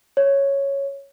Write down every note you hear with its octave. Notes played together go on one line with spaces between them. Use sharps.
C#5